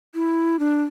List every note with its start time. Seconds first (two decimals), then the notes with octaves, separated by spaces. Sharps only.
0.15 E4
0.59 D4